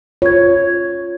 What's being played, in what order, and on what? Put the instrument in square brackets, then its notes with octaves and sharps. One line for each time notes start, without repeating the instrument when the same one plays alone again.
[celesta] F4 G#6 [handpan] C#5